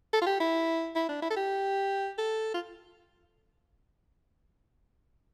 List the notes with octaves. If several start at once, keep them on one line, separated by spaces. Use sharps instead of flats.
A4
F4
G4
E4
E4
D4
E4
A4
G4
A4
F4